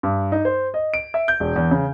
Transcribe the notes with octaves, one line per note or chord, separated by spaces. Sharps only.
G2
D#4
C5
D#5
D7
E5
G6
E1
E2
C#3